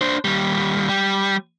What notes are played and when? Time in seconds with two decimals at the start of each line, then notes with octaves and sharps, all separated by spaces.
0.01 D4 C5
0.25 D#2 G3
0.89 G3